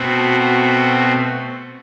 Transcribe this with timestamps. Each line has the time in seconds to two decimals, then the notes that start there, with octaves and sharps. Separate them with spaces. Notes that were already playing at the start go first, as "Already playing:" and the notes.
Already playing: B2 A3 C4 F#4
0.39 F#4